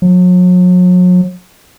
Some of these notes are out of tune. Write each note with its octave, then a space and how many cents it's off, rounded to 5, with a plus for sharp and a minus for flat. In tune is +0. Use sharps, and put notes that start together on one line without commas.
F#3 -40